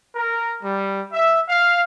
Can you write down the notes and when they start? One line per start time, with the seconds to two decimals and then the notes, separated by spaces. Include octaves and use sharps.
0.14 A#4
0.63 G3
1.13 E5
1.48 F5